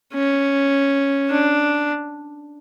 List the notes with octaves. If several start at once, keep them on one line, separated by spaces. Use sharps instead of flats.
C#4
D4